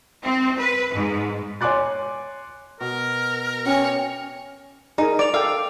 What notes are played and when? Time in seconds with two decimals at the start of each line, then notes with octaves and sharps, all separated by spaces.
0.23 C4
0.59 B4
0.93 G#2
1.61 C#5 G#5 C6 D6 F#6 A6
2.81 B2 A#4
3.65 C#4 G4 C#5 G5 G#5 F6
4.98 D#4 G#4 A#4
5.19 D5 D7 F7
5.34 A4 F5 G5 D6 E6